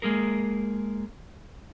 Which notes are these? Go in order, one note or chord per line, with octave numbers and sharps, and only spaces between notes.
G#3 A#3 G#4 A#4